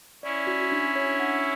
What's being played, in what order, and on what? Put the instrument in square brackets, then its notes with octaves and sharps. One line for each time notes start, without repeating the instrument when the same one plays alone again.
[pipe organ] C#4 E4 [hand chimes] D5
[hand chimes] F#4
D4
C#5
F#5